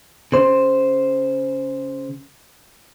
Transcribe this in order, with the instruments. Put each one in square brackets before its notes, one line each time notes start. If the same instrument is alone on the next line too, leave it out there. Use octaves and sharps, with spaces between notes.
[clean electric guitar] C#3 C5